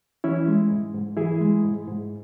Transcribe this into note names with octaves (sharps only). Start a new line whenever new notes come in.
E3 C#4 E4
G#3
G#2
G#2
E3 E4 G#4
G#3
G#2
G#2